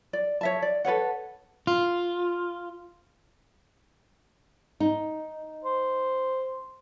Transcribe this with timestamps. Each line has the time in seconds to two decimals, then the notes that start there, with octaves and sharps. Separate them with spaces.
0.13 D5
0.41 C#5 E5 A5
0.62 D5
0.85 A4 B4 C#5 F#5
1.67 F4
4.80 D#4
5.65 C5